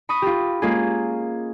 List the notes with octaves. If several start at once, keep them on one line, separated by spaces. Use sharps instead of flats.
B5 C#6 D#6 A#6
F4 G4
G#3 A#3 C#4 F4 G#4